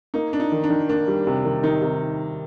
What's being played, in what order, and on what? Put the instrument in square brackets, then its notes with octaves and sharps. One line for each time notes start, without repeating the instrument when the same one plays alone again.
[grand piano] A#3 [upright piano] D#4
[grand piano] A#3 [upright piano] D4
[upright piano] D#4
[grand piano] D#3
[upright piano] D4
[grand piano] D#3
[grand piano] A#3 [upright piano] D4
[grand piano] G3
C3
D#3
[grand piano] D#3 [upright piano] D#4
[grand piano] C3